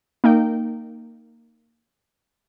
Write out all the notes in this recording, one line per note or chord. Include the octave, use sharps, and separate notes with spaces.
A#3 D#4 G5